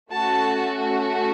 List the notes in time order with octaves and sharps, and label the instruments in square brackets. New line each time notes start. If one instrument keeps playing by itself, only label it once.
[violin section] A3 C#4 F#4 A4 A5